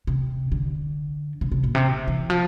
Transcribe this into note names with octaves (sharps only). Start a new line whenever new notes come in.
C3
D3
C3
C3
A#2
C3
E3
F3